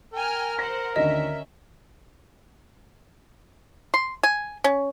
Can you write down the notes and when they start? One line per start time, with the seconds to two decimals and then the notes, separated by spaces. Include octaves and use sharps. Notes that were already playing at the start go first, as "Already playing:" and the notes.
0.14 A#4 G5 G#5 F6
0.59 C5 F#5 A#6
0.96 D2 D3 D#3 C#4 D#5 E5
3.94 C6
4.23 G#5
4.64 C#4